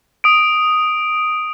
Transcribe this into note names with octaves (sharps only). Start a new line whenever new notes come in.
D#6 D7